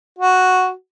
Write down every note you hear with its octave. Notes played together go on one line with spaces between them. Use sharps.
F#4